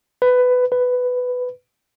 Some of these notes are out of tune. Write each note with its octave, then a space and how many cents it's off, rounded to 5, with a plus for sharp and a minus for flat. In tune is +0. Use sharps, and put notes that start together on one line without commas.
B4 +15
B4 +10